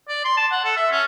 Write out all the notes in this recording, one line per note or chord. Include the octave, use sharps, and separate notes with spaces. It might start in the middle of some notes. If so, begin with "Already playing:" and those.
D5
C6
A5
F#5
A4
E5
C#4